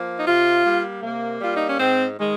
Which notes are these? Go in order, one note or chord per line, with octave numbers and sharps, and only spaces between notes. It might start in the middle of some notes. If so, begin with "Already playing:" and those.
Already playing: F3 A#3
D#4
C3 F4
G3 A#3
C3 A#3
G3 A#3 F4
D#4
C#4
G#2 C4
D#3 G#3